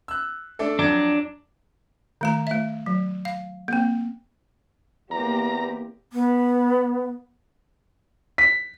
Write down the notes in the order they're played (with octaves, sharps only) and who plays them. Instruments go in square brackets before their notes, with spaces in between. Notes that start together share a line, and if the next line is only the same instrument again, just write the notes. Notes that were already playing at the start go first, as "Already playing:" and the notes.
[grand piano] E6 F#6
A3 D4 A4
[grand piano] F2 F#3 [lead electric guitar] D4
[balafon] D#3 A3 A#5
A3 E5
F#3
F5
A#3 C4
[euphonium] E2 [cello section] A#3 C4 G4 [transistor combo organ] A#5
[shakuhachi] B3
[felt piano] B6